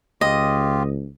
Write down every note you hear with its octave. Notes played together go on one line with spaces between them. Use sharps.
C#2 F4 G4 D#5